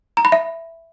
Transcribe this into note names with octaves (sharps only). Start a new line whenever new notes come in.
A#5
B5
E5